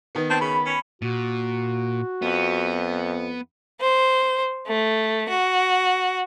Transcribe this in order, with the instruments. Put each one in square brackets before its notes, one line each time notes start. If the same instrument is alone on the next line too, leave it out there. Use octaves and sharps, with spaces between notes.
[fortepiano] D#3 B3
[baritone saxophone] C4 [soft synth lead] A5
[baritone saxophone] C#3 [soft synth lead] B5
[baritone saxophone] C#4
[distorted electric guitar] A#2 [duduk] F#4
[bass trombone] F2 [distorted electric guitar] B3
[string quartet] C5
A3
F#4